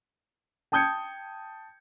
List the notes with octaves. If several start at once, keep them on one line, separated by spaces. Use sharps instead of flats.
G5 A5 D#6 G6 G#6 C#7